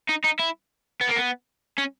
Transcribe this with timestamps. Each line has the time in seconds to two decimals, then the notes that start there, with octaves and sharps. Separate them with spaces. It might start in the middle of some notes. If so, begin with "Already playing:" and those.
0.09 D#4
0.25 D#4
0.40 E4
1.01 B3
1.09 A#3
1.16 B3
1.78 C#4